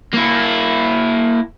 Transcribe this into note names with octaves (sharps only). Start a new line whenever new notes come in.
A#3 E4